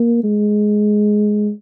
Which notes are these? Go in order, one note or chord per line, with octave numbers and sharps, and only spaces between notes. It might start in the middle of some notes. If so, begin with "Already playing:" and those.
Already playing: A#3
G#3